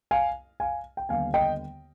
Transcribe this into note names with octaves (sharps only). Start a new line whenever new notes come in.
F5 G#5
F5 G#5
G5
D#2 D3 G3 B3 F5 G#5
D#5 G5